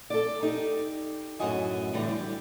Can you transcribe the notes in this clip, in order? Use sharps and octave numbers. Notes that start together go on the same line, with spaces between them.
A4 D5
D#4 G4
F#2 A2 F#4 D#5 G#5
A2 D3 E3 G3
G3